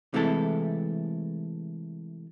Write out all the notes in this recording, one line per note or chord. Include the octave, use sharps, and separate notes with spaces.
C3 E3 G#3 A3 E4 A4